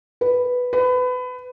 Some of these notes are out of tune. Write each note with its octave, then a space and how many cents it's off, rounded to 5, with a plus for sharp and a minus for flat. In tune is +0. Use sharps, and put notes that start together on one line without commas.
B4 +0
B4 +25